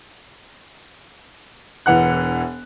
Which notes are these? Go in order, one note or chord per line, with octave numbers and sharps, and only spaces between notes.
E1 E3 F#5 F#6